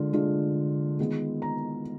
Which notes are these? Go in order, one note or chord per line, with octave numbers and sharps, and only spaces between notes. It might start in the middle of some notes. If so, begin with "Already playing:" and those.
Already playing: D3 G#3 D4 F4
D3 G#3 D4 F4
D#3 G#3 B3 F4
A#5